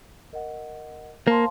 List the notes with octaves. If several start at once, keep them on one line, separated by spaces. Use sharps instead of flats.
A#4 D#5 F#5
A#3 C5 F5 A5 C6